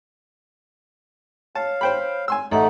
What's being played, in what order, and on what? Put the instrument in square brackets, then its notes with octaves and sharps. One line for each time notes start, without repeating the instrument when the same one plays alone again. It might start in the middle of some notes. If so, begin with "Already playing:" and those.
[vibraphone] C#5 [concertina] F5 [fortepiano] A5
[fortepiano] C5 G5 B5
G#5 C6 E6
[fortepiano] A1 [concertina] A3 D#4 [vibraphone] A4 F#5